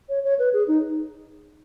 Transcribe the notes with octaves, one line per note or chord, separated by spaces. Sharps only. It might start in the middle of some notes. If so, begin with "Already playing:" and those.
C#5
C#5
B4
G#4
D#4